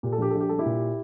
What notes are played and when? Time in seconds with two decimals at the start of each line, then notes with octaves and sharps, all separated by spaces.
0.03 A#2 G4
0.12 A4
0.18 A#1 G4
0.31 A#1 A4
0.40 G4
0.49 G3 A4
0.59 E4 G4
0.66 A#2